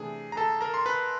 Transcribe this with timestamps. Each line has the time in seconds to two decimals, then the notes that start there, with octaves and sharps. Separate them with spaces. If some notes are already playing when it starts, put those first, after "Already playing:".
Already playing: C3 E3 A3 D4 G#4
0.32 A#5
0.37 A4 A5
0.61 A#4 A#5
0.74 C6
0.86 B4 B5